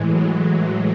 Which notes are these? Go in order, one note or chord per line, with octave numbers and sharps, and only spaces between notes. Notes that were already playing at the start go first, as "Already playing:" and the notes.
Already playing: A2 E3 G#3
F#3